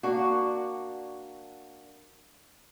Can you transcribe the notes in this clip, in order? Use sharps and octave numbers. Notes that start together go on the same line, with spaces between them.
A#3 D4 F#4